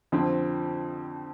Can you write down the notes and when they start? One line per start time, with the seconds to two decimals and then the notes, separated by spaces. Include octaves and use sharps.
0.12 F2 D3 F3 C4